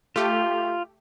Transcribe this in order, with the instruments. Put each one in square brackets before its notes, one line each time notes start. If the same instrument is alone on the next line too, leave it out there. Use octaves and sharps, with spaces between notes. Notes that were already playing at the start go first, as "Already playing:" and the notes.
[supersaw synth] A3 G4 [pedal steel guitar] F4